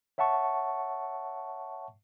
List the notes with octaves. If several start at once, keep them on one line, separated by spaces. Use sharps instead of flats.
C#5 E5 F#5 A5 C#6